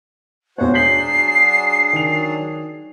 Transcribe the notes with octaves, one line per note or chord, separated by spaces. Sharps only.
E1 B1 F#4 C5 C#5 F#5
F#3 D4 G#4 G6 B6 C7 F#7
D#3 F7